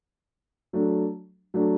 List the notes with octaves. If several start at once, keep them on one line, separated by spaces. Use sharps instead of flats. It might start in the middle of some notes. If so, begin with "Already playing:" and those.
F#3 A3 D4
F#3 A3 D4